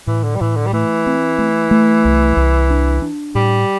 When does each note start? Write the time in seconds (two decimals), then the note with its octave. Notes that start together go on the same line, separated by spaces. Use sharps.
0.07 A2 E3
0.24 D3
0.36 G3
0.41 A2 E3
0.57 D3
0.67 G3
0.73 E3 A3
1.06 C4
1.38 A3
1.71 A3
2.05 C2
2.37 C2
2.70 D4
3.02 D4
3.35 A2 G3